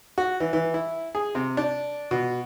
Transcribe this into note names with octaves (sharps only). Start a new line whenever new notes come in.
F#4
E3
E3
E4
G#4
C3
D4
B2